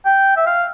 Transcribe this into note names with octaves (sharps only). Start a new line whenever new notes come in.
G5
E5
F5